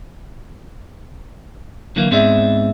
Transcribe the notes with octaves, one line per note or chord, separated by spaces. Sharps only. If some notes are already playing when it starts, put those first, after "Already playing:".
D3 E3 F#3 A#3
G#2 B3 C4 G#4 D5 E5